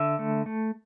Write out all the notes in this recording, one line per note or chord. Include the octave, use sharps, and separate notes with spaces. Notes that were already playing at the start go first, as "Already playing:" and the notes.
Already playing: D3 E5
A3
A3